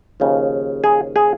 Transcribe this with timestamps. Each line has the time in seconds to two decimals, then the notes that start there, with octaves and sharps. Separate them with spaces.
0.20 D#2 C#3 F3
0.84 G#4
1.16 G#4